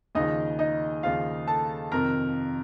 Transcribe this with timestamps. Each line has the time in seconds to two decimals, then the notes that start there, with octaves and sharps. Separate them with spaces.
0.15 D#2 C#3 F3 D#4 D#5
0.59 D#4 D#5
1.03 D#2 C#3 F3 F4 F5
1.47 A4 A5
1.92 F2 C3 D#3 A#4 A#5